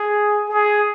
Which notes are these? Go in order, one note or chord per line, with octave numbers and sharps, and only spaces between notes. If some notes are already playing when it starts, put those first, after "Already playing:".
Already playing: G#4
G#4